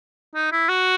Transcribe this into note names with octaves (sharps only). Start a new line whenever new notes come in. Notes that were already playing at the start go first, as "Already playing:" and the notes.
D#4
E4
F#4